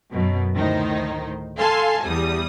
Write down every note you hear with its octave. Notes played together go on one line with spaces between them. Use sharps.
F#2 B2 F#3
D2 A2 D#3 D#4 C5
A4 F5 G#5 A5 C6
E2 G3 D#6